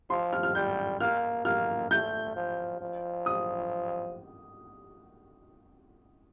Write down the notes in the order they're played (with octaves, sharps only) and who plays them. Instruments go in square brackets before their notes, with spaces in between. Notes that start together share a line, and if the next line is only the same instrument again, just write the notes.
[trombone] F3 [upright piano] C6
[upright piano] F6
F6
[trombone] G3 [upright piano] G6
[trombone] A#3 [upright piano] F6
[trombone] A#3 [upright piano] F6
[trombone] A3 [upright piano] G6
[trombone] F3
F3
[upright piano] D#6